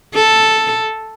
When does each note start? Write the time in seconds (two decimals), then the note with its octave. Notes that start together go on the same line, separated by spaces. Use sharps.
0.15 A4